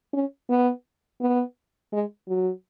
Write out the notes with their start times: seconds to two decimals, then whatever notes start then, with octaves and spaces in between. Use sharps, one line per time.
0.13 C#4
0.49 B3
1.21 B3
1.92 G#3
2.28 F#3